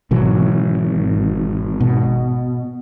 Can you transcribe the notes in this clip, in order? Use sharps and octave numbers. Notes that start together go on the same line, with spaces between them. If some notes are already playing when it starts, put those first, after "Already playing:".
G#1 B2 E3 F#3
B2